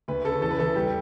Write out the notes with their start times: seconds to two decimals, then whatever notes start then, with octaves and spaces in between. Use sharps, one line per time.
0.08 D2 B4
0.24 C#3 A4
0.41 E2 A4
0.51 B4
0.59 E2 A4
0.76 G3 G4